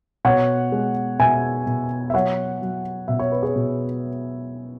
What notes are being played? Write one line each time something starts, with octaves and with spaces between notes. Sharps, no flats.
B2 C#5 F#5
G#3
B2 E5 G#5
B2
E5
F#3 C#5 F#5
F#3
B2 E5
C#5
B4
G#4 C#5
B2